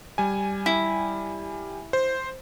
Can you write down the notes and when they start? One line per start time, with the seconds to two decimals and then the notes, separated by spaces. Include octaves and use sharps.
0.18 G3 G#5
0.66 E4
1.93 C5